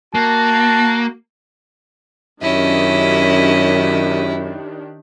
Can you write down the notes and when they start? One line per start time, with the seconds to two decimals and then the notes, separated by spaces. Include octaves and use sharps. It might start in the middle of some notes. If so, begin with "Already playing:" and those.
0.15 A#3 F#4 A5
2.42 F#2 D#3 C#4 D4 E4 G4 D#5